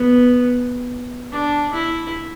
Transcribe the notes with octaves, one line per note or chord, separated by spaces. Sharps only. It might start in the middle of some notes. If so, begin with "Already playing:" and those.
Already playing: B3
D4
E4